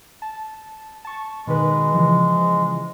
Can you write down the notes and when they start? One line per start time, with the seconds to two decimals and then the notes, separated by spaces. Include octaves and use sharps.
0.22 A5
1.05 A5 C#6
1.47 B2 D#3 G#3 B4
1.94 C#3 E3 F3